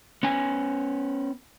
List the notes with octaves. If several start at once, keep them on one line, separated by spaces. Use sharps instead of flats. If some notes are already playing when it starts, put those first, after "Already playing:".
B3 C#4 G#5